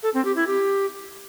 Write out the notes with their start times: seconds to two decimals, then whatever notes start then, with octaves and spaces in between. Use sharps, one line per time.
0.03 A4
0.14 C4
0.25 G4
0.36 E4
0.47 G4